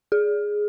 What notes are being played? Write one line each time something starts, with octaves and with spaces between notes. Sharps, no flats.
G#4